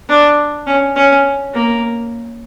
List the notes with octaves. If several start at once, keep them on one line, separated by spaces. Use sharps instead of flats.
D4
C#4
C#4
A#3